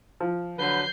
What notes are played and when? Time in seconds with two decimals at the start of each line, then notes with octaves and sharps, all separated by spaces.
0.21 F3
0.59 D3 F#3 B4 G6 C7